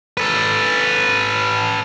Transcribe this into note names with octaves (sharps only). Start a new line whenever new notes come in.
A4 B4